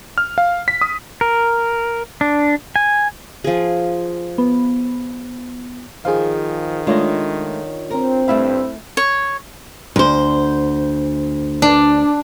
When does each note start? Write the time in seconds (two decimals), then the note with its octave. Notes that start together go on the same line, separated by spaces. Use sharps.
0.18 F6
0.38 F5
0.68 B6
0.81 D#6
1.21 A#4
2.21 D4
2.76 G#5
3.44 F3 G#4
4.38 B3
6.05 D#3 F3 G#4 C5 F5
6.87 G#3 A3 D4 F4 C#5 D#5
7.91 C4 A#4
8.28 G2 A3 E4 E5 F5 B5 E6
8.97 C#5
9.96 D2 C5
11.62 D4